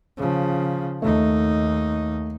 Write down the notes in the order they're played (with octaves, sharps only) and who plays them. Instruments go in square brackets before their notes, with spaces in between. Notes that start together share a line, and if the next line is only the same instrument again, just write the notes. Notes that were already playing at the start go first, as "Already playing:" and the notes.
[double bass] C#3 F3
[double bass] D#2 D#4 [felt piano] A3